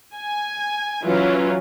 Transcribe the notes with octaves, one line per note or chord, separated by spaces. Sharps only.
G#5
E3 F#3 C#4 F4